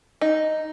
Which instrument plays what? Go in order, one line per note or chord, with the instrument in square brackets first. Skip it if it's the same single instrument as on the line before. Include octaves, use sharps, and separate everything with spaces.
[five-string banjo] D#4